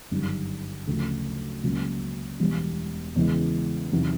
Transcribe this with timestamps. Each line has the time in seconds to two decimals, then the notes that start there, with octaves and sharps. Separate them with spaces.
0.11 G1 F#2 D#3 G3
0.87 D2 C#3 F3 A3
1.63 C#2 C#3 F#3 A#3
2.40 E1 E2 B2 G3
3.16 E2 C#3 E3 G#3
3.92 E2 C3 D#3 F#3 B3